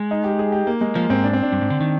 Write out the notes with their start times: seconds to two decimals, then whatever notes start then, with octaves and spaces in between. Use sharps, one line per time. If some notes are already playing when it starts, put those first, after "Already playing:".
Already playing: G#3
0.11 D#4
0.24 G4
0.39 G#4
0.52 G4
0.67 A#3
0.81 G#3
0.95 F3 A#3
1.10 G#2 C4
1.24 D4
1.33 C4
1.43 D4
1.52 G2
1.61 G#2
1.70 D3
1.81 D#3